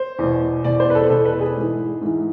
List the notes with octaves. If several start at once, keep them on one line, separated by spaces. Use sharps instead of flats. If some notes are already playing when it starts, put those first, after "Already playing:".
Already playing: C5
E2 B2
E2 B2 D5
C5
B4
A4
E2 B2 A4
B4
G#4
G#2 E3
G#2 E3